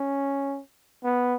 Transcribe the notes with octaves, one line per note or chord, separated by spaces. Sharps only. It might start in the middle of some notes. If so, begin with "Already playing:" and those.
Already playing: C#4
B3